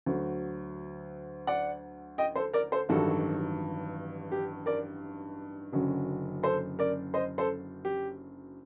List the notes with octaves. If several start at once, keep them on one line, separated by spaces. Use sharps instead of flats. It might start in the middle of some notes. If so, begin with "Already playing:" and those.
D2 D3 F#3
D5 F#5
D#5 G5
A4 C5
A#4 D5
A4 C5
A1 G2 D#3 F#3 F#4 A4
G4
A#4 D5
F#1 F#2 D3 F#3
A4 C5
A#4 D5
C5 D#5
A4 C5
G4